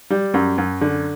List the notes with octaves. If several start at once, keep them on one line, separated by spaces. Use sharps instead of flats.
G3
F#2
F#2
D3